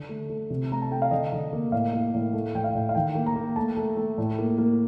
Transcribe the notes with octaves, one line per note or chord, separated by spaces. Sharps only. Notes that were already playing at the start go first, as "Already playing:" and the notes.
Already playing: D3
A3
A3
C3
A3 A#5
A5
A3 G5
F5
D3 D#5
D3
A#3
A2 F5
A#3
A2
A3
A2 G5
F5
A2
F5
D#3 G5
A#3
A#5
A#3
A3 A5
A3
A3
A2
A#3
A#3